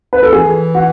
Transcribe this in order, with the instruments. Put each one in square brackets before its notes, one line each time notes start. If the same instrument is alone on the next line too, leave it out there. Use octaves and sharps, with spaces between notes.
[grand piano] B4
A4
[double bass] E3 [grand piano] G#4
[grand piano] F#4